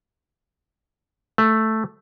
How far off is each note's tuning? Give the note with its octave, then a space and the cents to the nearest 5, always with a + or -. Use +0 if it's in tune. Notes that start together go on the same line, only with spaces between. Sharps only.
A3 +0